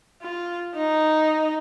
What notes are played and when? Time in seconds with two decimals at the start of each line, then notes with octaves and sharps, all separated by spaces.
0.22 F4
0.75 D#4